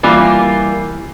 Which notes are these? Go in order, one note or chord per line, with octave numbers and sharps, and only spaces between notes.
E3 G3 A#3 F4